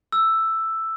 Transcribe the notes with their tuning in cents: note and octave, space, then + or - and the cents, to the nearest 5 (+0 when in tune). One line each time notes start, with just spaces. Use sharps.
E6 +5